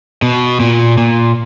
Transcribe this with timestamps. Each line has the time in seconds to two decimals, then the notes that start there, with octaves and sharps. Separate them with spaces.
0.22 B2
0.60 A#2
0.98 A#2